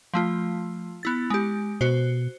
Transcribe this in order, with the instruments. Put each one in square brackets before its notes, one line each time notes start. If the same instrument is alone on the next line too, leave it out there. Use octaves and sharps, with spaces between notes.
[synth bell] F3 A3 F4
B3 E4 A6
G#3 G4
[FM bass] B2 [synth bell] F#4 C5